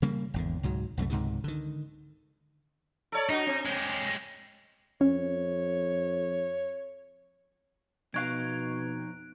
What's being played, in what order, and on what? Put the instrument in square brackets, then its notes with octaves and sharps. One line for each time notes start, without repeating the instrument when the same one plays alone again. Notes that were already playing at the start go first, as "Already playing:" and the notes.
[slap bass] C#3 G3 A#3
G#1 E2 D3
C#2 G#2 B2 F#3
C2 F#2 G#3 A3
C#2 G#2 C3 D#3
D3 D#3
[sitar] A4 C#5 D5
[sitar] D4 F#4 [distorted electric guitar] D#4
[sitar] C4
[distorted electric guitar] G#3 G4
[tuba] F2 [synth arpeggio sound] C#4 [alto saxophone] C#5
[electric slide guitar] F2 D#4 F5 [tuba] B2 [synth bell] C#6 G#6 [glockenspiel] F#6 D7